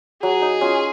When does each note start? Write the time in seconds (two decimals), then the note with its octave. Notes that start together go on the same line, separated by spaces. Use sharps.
0.23 F#3 G#4
0.42 D#4
0.61 C#4 F4